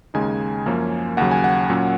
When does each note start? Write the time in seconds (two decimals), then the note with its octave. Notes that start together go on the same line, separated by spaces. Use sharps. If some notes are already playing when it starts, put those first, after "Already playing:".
0.14 D#2 C#3 G#3 D#4 G#5
0.66 F#2 F3 A#3 C#4
1.17 D#2 C#3 F#3 F#5
1.31 G#5
1.44 F#5
1.70 A#2 F#3 C#4